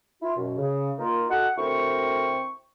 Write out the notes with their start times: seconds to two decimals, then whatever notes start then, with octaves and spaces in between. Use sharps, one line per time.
0.22 E4 F4
0.37 F#2 B2
0.58 C#3
0.99 A#3 D#4 F4
1.30 F#4 A4 D#5 F#5
1.58 D2 C4 E4 A#4 G5 C#6